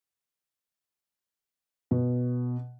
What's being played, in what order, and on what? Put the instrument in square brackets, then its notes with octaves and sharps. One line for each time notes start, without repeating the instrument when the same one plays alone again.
[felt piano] B2